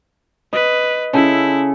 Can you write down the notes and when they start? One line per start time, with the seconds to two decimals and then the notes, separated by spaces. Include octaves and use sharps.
0.53 B4 D#5
1.14 C#3 E4 A4 C6